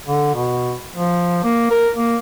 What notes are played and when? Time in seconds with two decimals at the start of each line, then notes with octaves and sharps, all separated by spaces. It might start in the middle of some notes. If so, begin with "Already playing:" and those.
0.07 D3
0.34 B2
0.95 F3
1.44 A#3
1.71 A#4
1.96 A#3